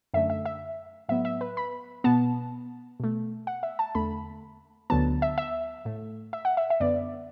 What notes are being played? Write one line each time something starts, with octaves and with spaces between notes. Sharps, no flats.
F#2 D3 A3 E5
E5
E5
A2 F#3 B3 E5
E5
B4
B5
B2 B3 A5
B2 A3
F#5
E5
A5
E2 D3 A3 B5
D2 D3 F#3 B3 A5
E5
E5
A2 A3
E5
F#5
E5
E5
F#2 D3 B3 D5